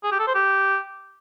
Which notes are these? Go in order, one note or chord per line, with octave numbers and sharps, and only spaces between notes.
G#4
G4
A4
C5
G4